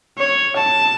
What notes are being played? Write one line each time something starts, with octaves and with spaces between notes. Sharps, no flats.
C#5
A5